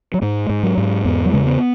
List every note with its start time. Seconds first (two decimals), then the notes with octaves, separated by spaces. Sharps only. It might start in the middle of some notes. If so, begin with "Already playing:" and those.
0.14 F#3
0.22 G#2 G#3
0.49 G#2
0.63 F#3
0.77 G#2
1.05 E2 B3
1.26 F#3
1.32 C#3 G#3
1.40 A3
1.46 B3